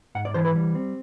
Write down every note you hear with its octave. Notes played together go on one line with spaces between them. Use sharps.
G#2 F#5
D5
E3 C5
B4
G3
C4